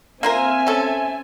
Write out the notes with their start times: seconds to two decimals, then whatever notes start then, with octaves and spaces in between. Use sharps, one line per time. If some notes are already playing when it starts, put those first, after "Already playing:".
0.23 A#3 C4 F4 A#4 E5 G#5
0.67 C#4 A4